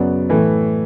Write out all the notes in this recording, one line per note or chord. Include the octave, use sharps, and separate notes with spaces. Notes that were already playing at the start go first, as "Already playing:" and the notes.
Already playing: F#2 C#3 F#3 B3 D5
A2 E3 A3